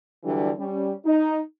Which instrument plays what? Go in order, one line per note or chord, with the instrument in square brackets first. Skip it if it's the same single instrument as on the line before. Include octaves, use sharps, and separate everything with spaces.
[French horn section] D3 E3 F#3 G3 D4
G3 C#4
D#4